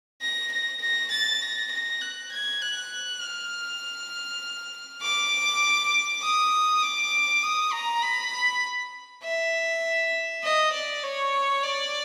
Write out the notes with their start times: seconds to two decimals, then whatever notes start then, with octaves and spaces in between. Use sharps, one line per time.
0.21 A#6
0.52 A#6
0.81 A#6
1.11 A6
1.41 A#6
1.71 A#6
2.01 F#6
2.32 G#6
2.62 F#6
3.21 F6
5.02 D6
6.22 D#6
6.82 D6
7.43 D#6
7.72 A#5
8.02 B5
9.23 E5
10.43 D#5
10.72 D5
11.03 C#5
11.63 D5